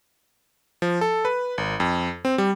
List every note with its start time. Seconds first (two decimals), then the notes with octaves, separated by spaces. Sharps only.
0.82 F3
1.01 A4
1.25 B4
1.58 G#1
1.80 F2
2.25 C4
2.38 G3